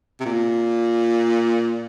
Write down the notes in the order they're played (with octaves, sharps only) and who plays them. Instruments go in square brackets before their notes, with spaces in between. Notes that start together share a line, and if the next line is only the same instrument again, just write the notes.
[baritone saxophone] C3
A#2